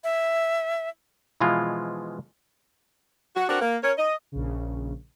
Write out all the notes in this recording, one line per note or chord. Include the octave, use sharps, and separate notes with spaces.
E5
B2 E3 F3 G#3 F4
F#4
C4 D4 F#4 A#4 F#5
A#3
C#4 A#4 C#5
D#5
A#1 C#3